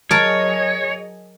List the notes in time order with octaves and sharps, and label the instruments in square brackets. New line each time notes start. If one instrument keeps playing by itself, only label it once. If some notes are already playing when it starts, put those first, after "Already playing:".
[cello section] F#3 G#4 D#5 [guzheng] A#4 A5 [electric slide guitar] C#5